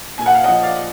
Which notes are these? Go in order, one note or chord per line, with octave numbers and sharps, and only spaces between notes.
A#2 G#5
F#5
F5
F3 D#5 F#5
D5 F5